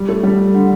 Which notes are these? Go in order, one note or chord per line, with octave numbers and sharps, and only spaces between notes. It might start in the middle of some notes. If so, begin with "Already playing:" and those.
Already playing: G3
A3
G3
D3